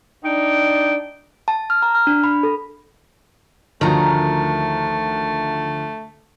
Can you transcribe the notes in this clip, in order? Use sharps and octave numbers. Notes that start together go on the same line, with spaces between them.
D4 D#4 G5
A5
F6
A#5
F6
D4
B5
A4
D2 D#3 F3 A3 F#4 A#5